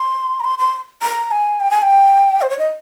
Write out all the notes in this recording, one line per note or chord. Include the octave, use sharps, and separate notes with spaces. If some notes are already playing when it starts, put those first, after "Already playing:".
Already playing: C6
A#5
C6
C6
A#5
G#5
G5
G#5
G5
C5
C#5
D#5